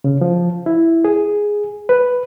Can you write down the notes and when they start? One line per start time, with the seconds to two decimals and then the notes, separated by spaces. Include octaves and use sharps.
0.04 C#3
0.21 F3
0.66 E4
1.05 G#4
1.89 B4